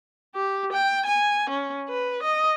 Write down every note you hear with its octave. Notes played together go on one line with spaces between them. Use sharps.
G4
G5
G#5
C#4
B4
D#5